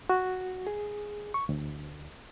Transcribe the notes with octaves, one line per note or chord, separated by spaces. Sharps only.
F#4
G#4
C#6
D2